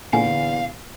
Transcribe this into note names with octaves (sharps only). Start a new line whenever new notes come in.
E2 A#2 D3 F5 G#5